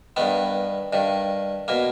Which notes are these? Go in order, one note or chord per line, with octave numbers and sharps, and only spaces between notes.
G2 D#3 B3
G2 D#3
B2 A#3